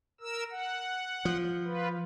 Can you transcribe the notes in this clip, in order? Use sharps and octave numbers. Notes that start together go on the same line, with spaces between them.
A#4 E6
F#5
F3
F4 B4